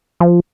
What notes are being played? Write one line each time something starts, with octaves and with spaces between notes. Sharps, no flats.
F3